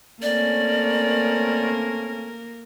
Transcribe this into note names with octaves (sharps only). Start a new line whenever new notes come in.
A3 A#3 C4 C#4 A#4 D5